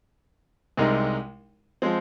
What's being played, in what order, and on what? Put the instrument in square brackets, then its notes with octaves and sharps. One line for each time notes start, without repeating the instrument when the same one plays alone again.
[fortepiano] C2 C3 G#3 D#4 A#4
F3 G#3 C4